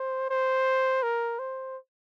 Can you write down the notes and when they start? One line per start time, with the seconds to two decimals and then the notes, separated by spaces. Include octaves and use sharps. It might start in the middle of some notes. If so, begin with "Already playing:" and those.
Already playing: C5
0.30 C5
1.03 A#4
1.39 C5